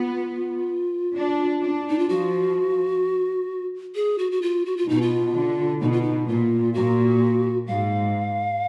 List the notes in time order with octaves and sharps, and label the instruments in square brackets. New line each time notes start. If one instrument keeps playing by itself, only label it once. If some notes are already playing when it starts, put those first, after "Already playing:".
Already playing: [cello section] B3 [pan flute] F4
[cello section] D4
D4
[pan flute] D#4
F4
[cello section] F3 [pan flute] F#4
[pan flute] G#4
F#4
F#4
F4
F#4
F4
[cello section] B2 [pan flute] D#4
[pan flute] F4
[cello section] D3
[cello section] B2 [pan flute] D#4
[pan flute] F4
D#4
[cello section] A#2 [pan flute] F4
[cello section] A#2 [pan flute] F#4
[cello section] G#2 [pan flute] F5